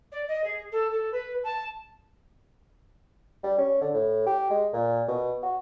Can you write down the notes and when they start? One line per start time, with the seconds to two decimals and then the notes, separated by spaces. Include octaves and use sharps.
0.11 D5
0.27 D#5
0.44 G#4
0.72 A4
0.91 A4
1.12 B4
1.43 A5
3.44 G3
3.58 C#4
3.81 D3
3.94 A2
4.26 G4
4.50 G#3
4.73 A#2
5.08 B2
5.43 F#4